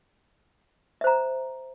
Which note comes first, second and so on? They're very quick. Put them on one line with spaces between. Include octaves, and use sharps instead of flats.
E5 C5 A#5